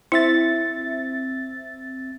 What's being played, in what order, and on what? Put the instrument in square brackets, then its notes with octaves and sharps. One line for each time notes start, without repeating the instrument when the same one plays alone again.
[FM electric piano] C4 E5 A6 [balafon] E4